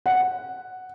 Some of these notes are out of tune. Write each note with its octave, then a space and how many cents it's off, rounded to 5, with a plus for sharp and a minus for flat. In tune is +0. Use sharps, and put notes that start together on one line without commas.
F#5 +0